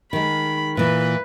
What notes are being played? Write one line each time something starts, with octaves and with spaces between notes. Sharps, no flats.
D#3 G#3 B5
A#2 E3 B4